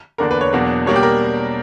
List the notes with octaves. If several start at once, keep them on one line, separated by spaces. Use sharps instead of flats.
E2 D3 A#3 D4 A#4
B4
C#5
E2 B2 F#3 A#3 D4
B2 G3 A#3 D4 C#5
G4
A#4